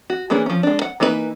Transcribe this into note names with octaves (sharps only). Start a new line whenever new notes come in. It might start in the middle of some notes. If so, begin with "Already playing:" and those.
F#4
E3 A#3 C#4 D4 G#4
F3 C#4
G#3 D4
F#5
E3 A#3 D#4 G#4 B4